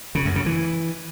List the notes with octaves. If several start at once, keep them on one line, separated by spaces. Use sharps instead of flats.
C#3
F#2
C#3
E3